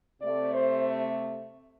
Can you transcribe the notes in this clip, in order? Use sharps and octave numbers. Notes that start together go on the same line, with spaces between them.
C3 A3 D5
C5